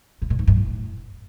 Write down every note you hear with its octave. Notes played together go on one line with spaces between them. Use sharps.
A2
A#2
G#2
G2
A2